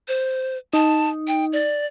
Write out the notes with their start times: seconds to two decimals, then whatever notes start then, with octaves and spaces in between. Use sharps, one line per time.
0.08 C5
0.73 D#4 A5
1.28 G5
1.53 D5